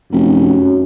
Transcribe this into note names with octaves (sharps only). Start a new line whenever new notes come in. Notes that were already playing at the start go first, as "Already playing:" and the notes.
F1 F#2